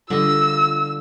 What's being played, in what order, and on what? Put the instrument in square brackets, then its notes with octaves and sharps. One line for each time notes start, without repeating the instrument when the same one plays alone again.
[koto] D3 D#5 [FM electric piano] G3 [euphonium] F4 [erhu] E6